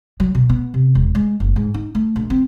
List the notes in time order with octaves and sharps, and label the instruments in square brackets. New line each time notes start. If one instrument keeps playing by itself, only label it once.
[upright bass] F#3
B2
B3
C3
E1
G#3
F#1
G#2
D#4
A3
A#1
C4